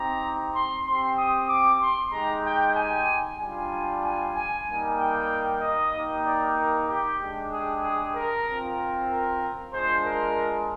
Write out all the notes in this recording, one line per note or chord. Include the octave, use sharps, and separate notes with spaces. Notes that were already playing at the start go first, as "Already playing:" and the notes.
Already playing: C4 D#4 G4 A#5
C6
C4 G4 C6
D#6
D6
C6
G#3 D#4 G4 A#5
G5
G#5
G3 D4 F4 G#5
G#5
G#5
G3 A#3 D#4 G#5
G5
D#5
A#3 D#4 G4
D5
A#4
G4
G#3 D4 G4
G#4
G#4
A#4
C4 F4
A#4
G#3 D4 F4 C5
A#4